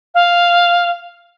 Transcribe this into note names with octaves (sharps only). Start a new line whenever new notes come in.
F5